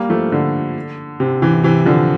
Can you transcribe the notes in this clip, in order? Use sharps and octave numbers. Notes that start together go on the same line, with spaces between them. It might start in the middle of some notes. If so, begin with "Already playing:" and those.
Already playing: G3 A#3
F3 A3
D3
C3
C3 E3
C3 E3
D3 F3